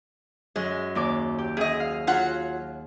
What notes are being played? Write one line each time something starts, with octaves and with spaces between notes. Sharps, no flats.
F#2 G#3
D#2 D5 D6
G4
F#2 G#4 D#5
F5
F#3 F4 F#5